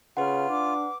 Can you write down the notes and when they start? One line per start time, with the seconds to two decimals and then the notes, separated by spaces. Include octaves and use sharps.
0.17 C#3 F4 B4 F#5
0.49 D4 D6